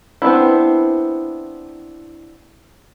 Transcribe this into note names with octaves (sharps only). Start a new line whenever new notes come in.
B3 C4 D4 E4